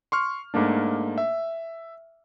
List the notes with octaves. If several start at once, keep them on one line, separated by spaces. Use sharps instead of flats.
C6 C#6 F6
G#2 A3 A#3 D4
E5